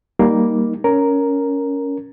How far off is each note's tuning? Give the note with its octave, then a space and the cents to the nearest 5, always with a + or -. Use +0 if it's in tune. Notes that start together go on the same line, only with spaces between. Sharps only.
G3 +0 A#3 +0 D#4 +0
C#4 +10 A#4 +0